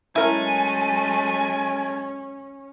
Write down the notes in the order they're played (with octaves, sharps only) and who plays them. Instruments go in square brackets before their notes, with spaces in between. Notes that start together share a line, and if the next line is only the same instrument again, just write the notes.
[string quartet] F#3 G#3 A3 [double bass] C#4 [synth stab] E4 A#4 [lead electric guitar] G#5